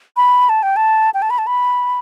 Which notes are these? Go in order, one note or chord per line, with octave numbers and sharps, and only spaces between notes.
B5
A5
G5
A5
G5
A5
B5
A5
B5